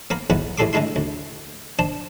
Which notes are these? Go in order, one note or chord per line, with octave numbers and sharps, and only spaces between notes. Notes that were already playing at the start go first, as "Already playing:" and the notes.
A#3 B3 A#4 B5
B1 E2 B3 F#5 B5
E2 A2 G3 A4 C6 D6
D3 G#3 A3 E4 C6
D2
D4 C5 A5